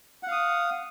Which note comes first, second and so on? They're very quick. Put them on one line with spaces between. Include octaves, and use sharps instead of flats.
F#5 F5 D#6